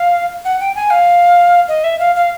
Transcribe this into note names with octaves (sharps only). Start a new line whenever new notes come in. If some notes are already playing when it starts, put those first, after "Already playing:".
Already playing: F5
F#5
G5
G#5
F5
D#5
E5
F5
F5